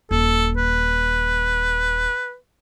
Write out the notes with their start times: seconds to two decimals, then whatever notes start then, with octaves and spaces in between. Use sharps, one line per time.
0.11 D#1 A4
0.57 B4